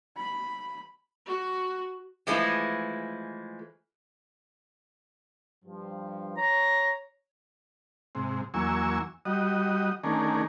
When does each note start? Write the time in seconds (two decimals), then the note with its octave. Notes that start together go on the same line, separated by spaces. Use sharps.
0.17 B5
1.25 F#4
2.27 E3 F3 G#3 A3 E4
5.65 G2 F3
6.37 C#5 A#5
8.15 G#2 C3
8.54 E2 F#3 A#3 G#5 C#6 E6
9.25 G3 F#4 D#5
10.04 D#3 A3 C#4 D4 G#4 A#4